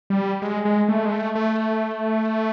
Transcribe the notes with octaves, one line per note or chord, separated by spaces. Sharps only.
G3
G#3
G#3
A3
G#3
A3
A3